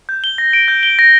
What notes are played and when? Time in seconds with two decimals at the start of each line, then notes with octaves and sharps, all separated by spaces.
0.09 G6
0.24 G7
0.38 A#6
0.53 D7
0.68 G6
0.83 G7
0.99 A#6